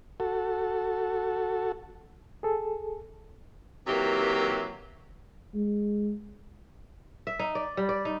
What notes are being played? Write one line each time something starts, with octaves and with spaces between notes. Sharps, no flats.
F#4 A4
G#4 A4
C3 D#3 E3 F#3 A#3 G4
G#3
E5
D#4
D5
G3
D5
D#4